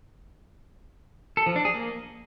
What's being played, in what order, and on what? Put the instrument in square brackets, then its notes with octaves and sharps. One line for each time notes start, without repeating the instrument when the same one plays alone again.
[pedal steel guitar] A4
F3
D4
G#4
A#3